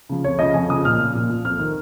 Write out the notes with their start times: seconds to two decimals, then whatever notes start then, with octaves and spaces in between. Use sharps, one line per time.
0.09 C#3 F3
0.24 F2 C#5
0.39 C#3 F3 D#5
0.54 F2 G#5
0.69 C#3 F3 D#6
0.85 A#2 F6
0.99 F3
1.14 A#2
1.29 F3
1.45 F2 F6
1.60 D#3